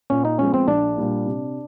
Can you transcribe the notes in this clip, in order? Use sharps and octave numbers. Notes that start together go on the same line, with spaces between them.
A#2 C#4
D#4
F3 G#3 B3 C#4
C4
A#1 D4
A#2 G3 A#3
C3